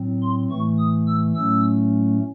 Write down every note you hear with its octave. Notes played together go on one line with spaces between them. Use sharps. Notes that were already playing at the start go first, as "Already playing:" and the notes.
Already playing: A2 F#3 C4
C6
A2 E3 A3 C#6
D#6
E6
A2 F#3 A3 C#4 E6